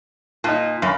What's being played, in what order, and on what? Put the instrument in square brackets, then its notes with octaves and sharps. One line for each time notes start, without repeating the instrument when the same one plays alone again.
[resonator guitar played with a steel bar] A#2 [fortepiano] D#4 A5
[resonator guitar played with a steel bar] F#2 [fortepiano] F5 B5